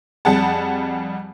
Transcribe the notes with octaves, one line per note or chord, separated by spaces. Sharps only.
F2 G3 G#4 F#5 A5